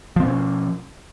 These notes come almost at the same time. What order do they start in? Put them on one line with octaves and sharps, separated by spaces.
F3 C4 B2 C#4